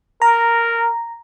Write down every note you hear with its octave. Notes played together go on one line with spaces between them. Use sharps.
A#4 A#5